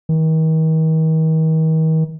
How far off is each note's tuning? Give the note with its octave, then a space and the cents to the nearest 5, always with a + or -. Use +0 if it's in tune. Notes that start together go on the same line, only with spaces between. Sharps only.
D#3 +40